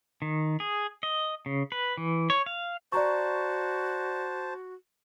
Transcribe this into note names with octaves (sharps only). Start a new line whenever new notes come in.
D#3
G#4
D#5
C#3
B4
E3
C#5
F5
F#4 C5 D5 A5 A#5 C#6